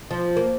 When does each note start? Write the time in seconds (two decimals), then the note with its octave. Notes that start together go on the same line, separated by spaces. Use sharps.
0.11 F3
0.37 A#3